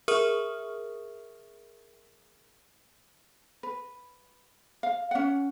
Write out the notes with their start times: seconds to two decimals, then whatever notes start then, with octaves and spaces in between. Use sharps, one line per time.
0.08 G#4 A#4 E5 C#6 D#6 F6
3.63 B4
4.83 F5
5.11 C#4 F#5